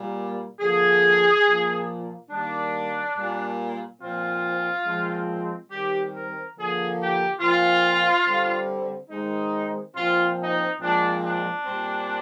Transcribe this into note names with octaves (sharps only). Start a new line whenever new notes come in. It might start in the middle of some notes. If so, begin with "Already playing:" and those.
Already playing: A#2 G3 A#3
D3 F3 A#3 G#4
A#2 F3 A#3
D#3 G3 A#3 D4
A#2 G3 A#3
A#2 F3 C4 F4
A#2 F3 G#3 C4
D#3 G3 C4 G4
A#4
D3 F3 A#3 G#4
G4
A#2 F3 C4 F4
D3 G3 C4
D#3 G#3 C4 D#4
A#2 F3 C4 F4
D#4
A#2 F3 G#3 C4 D4
D4
A#2 G3 C4